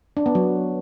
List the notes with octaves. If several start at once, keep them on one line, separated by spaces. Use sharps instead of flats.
D4
B3
F#3